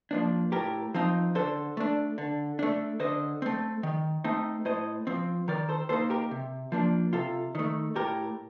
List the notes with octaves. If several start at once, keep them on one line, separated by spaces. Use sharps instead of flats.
F3 A#3 D4
A2 G4 A#4
F3 C4 D#4
D3 A4 C5
A3 D4
D3
A3 D4
D3 C5 D#5
A3 C4
D#3
A3 C4 D#4
A2 C5 D#5
F3 C4
D#3 A#4 D5
A4 C5
A#3 D#4 A4 C5
G4 A#4
C3
F3 A#3 D4
C3 F4 A4
D#3 A3
A2 G4 A#4